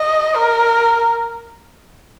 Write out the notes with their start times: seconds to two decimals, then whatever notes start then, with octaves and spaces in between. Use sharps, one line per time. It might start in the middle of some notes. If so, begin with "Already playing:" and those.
Already playing: D#5
0.36 A#4